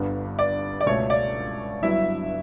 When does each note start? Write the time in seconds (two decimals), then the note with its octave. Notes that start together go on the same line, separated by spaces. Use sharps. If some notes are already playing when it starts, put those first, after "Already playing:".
Already playing: G1 G2 D3 G3 B3
0.39 D5
0.81 D5
0.86 C#2 B2 A3 C#5
1.10 D5
1.82 G1 G2 F#3 B3 E4 E5